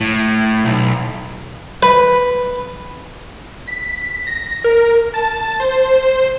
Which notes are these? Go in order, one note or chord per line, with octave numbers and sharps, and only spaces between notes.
A2
B1
B4
B6
A#6
A#4
A5
C5